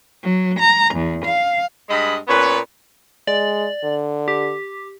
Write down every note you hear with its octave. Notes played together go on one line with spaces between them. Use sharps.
F#3
A#5
E2
F5
G2 G#3 D#5 B5
A#2 B3 C#4 B4
G#3 D5
D3
G4